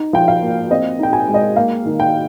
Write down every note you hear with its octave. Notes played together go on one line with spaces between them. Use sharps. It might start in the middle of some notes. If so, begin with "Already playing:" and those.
Already playing: D#4
F3 G5
F5
A#3
C4 D#5
D#4 G5
G#5
G#3
D#5
A#3 F5
D#3
G5